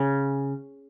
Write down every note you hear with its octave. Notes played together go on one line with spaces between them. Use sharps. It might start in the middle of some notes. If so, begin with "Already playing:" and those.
Already playing: C#3